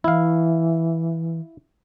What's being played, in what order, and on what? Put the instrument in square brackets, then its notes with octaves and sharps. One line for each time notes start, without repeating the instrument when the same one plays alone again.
[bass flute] E3 [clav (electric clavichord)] E4 F5